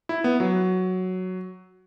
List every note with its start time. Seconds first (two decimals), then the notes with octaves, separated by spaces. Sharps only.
0.09 E4
0.24 B3
0.40 F#3